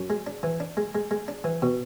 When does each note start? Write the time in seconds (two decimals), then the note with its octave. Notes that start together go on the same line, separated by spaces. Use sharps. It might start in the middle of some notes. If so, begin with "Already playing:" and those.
Already playing: F#2
0.10 G#3
0.27 D4
0.43 E3
0.60 D4
0.77 G#3
0.95 G#3
1.11 G#3
1.28 D4
1.44 E3
1.62 B2